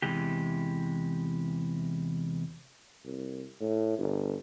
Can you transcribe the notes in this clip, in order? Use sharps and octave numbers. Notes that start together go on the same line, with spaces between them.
E2 G2 C3 E3 G#3 G4
C2
A2
G1